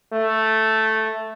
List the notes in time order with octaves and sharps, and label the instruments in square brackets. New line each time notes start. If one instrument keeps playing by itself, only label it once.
[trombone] A3